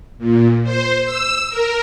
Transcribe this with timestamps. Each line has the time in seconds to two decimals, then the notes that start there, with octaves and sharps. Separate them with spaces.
0.18 A#2
0.63 C5
1.03 E6
1.49 A#4